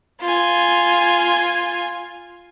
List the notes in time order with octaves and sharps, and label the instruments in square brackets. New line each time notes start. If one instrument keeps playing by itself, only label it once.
[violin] F4 G#5